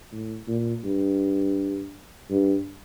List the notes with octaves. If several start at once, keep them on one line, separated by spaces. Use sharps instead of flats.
A2
A#2
G2
G2